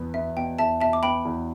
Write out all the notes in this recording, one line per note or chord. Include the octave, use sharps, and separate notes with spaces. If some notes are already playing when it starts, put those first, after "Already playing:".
Already playing: E2 B2 B3
B3 E5
B2 G5
E2 E5 A5
B2 E5 A5
D6
B3 G5 B5
E2